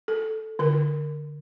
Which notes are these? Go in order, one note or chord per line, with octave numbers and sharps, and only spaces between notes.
A4
D3 A#4